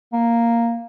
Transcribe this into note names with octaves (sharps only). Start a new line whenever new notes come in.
A#3